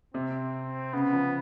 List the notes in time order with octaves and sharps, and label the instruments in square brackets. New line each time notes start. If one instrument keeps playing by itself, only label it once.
[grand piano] C3 [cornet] C4
[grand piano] C#3 [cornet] B3
[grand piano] F3